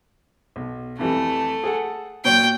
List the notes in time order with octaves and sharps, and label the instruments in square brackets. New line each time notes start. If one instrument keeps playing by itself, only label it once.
[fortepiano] B1
[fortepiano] F2 E3 G3 [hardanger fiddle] A3
[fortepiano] G#4 A4 F#5
[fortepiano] A#2 F#3 C#5 [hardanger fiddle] G5